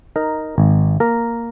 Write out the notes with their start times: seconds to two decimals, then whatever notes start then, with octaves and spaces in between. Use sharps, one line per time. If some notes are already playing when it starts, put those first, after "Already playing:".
0.16 D#4 A#4
0.58 G#1
1.00 A#3 A#4